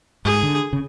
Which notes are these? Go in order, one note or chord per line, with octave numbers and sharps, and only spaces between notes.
G#2 G#4
D3
C#3